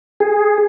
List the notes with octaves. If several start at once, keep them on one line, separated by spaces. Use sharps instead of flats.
G#4